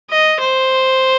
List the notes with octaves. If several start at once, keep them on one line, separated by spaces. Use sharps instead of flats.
D#5
C5